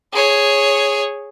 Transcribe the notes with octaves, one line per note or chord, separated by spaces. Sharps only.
G#4 C#5